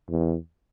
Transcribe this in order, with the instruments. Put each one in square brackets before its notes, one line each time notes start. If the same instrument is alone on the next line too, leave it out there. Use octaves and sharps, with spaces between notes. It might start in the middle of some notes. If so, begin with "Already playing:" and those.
[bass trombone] E2